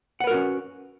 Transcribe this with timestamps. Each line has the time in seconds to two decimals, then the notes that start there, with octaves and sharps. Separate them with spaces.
0.20 F#5
0.24 B4
0.27 A#4
0.31 F#4
0.34 C#4